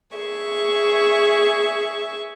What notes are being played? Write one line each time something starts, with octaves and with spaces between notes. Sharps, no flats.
G#4 E5 C#6